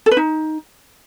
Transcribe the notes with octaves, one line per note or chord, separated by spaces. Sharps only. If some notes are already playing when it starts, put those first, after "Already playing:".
A4
B4
D#4